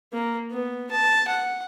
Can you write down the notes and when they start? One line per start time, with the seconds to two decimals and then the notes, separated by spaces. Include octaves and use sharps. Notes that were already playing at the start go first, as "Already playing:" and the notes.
0.13 A#3
0.51 B3
0.91 A5
1.28 F#5